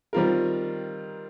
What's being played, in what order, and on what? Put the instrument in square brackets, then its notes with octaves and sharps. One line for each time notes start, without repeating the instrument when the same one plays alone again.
[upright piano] D#3 G3 C4 F4 A#4